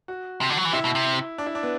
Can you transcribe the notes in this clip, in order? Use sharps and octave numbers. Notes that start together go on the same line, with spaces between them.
F#4
C3
D3
F#3
E3
C3 E4
B2
C3
D4
E4
D4
B3